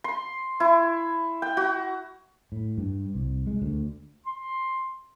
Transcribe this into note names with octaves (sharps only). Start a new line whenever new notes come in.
C6
E4
G5
F#4
A2
G2
C2
G#3
D2
C6